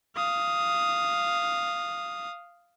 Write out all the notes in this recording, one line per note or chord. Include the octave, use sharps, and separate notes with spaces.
F5 D#6